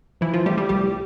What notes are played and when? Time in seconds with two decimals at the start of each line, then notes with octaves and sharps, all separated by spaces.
0.21 E3 F3 E4
0.34 F3 F4
0.46 G3 A3 G4
0.57 G3 G4
0.69 C2 G3 G4